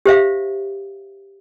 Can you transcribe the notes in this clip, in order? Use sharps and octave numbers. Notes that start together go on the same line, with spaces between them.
G4 C5 E5 F5